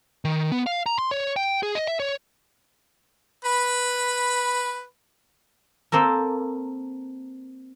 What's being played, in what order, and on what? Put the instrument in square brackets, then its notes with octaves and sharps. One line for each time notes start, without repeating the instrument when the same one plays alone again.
[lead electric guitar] D#3
B3
F5
A#5
C6
C#5
G5
G#4
D#5
E5
C#5
[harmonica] B4 B5
[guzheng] A#3 C4 A4 A#4